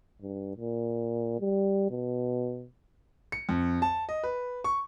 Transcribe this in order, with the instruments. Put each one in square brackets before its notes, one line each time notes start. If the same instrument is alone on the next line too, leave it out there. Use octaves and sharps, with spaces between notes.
[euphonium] G2
A#2
G3
B2
[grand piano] C#7
F2
A5
D#5
B4
C#6